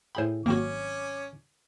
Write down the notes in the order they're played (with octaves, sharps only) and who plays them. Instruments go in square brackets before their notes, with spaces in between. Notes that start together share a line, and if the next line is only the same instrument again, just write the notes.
[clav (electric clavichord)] A2 G#4 G5 [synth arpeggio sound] C5 B5
[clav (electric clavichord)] G#1 F#2 [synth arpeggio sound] A#3 C4 F#4 [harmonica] C#4 D6